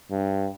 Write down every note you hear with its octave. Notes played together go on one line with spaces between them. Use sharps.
G2